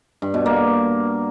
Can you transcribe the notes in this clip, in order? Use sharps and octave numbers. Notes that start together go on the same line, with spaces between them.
G2
B2
A#3